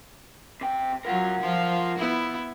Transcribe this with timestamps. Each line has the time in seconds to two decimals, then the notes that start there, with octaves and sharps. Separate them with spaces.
0.61 C3 G5
1.05 F#3 F4 A#4 F#5
1.41 F3 F4
1.98 B3 E4